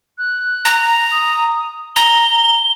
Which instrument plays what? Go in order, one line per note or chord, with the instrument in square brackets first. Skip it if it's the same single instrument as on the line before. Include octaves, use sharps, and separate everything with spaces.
[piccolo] F#6
[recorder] A#5
[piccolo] D#6
[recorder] A#5 [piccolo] G7